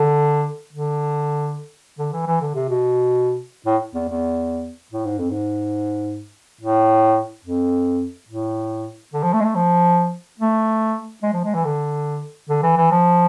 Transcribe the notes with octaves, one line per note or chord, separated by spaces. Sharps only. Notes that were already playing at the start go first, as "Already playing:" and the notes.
Already playing: D3
D3
D3
E3
E3
D3
C3
B2
A2
E2
E2
A2
G#2
F2
G#2
A2
F2
A2
D3
F3
A3
G#3
A3
F3
A3
G#3
F3
G#3
E3
D3
D3
E3
E3
F3